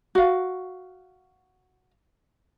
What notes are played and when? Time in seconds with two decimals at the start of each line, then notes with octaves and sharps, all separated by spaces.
0.15 F#4 F5